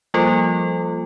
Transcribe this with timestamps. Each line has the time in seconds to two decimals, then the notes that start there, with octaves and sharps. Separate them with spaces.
0.14 F3 G3 A#3 F4 A4